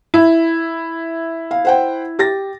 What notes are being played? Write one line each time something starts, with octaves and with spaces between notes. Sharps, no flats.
E4
F5
C5 F#5 G5
G4 A6 A#6